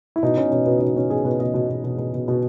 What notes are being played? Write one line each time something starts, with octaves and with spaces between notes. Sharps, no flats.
E4
B2 D#4
B2 C#4
B2 C#4
B2 B3
B2 D#4
B2 C#4
B2 G#4
B2 B4
B2 D#5
B2
B2
B2
B2
B2
B2